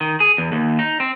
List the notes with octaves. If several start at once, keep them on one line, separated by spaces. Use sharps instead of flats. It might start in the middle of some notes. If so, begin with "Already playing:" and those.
D#3
G#4
E2
D#2
D#4
C4